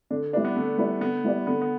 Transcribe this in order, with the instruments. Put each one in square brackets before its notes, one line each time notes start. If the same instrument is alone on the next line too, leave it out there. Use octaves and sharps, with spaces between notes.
[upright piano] D3 [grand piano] D4
[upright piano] G3 E4 B4 D5 [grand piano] D4
[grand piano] B3
[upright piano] D3 [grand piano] A3
[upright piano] G3 E4 B4 D5
[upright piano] D3 [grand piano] B3
[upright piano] G3 E4 B4 D5
[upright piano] D3 [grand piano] B3
[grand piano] B3